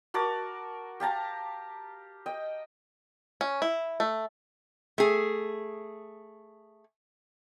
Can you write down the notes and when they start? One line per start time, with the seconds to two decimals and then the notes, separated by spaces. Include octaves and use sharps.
0.14 F#4 A#4 A5 D6
1.00 G4 F5 A5 A#5
2.26 D#5 G5
3.41 C#4
3.62 E4
4.00 A3
4.98 A3 G#4